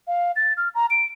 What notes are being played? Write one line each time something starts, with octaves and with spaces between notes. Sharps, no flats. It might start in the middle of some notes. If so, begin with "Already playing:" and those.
F5
A6
F6
A#5
D7